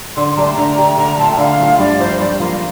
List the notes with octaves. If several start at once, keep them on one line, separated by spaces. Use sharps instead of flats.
D3 C6
A3 D4 G4 A#5
C6
D3 A#5
A3 D4 G4
D3 A#5
A3 C4 F4 A5
G5
D3 F5
A3 C4 F4
G2 D5
F3 A#3 F4 C5
G2 D5
F3 A#3 F4 F5